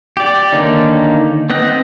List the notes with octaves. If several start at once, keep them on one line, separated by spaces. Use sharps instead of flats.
G4 D5
D3 D#3 A#3 C#4 D#4
B3 C4 D#5 F#6